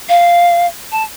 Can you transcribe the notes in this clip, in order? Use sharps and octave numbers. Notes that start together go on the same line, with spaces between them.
F5
A5